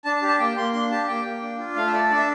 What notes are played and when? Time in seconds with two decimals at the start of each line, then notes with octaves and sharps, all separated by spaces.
0.05 D4 A5
0.16 A5
0.22 G4
0.28 A5
0.40 A#3 G5
0.57 A#3 C6
0.73 D4 C6
0.91 G4 A5
1.08 A#3 G5
1.24 A#3
1.42 D4
1.59 F4
1.76 A3 F5
1.87 E5
1.93 A4 D5
2.11 D4 D5
2.18 E5